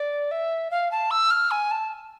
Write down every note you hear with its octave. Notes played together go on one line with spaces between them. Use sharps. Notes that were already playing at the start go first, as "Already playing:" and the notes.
Already playing: D5
E5
F5
A5
E6
F6
G#5
A5